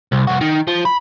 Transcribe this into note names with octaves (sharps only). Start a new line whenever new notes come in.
C2
C2 F#4
D#3
F3
B5